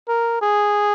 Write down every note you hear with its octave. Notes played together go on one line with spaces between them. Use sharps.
A#4
G#4